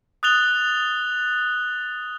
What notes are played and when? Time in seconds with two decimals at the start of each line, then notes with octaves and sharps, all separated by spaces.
0.23 D#6 F#6 A6 F7 G7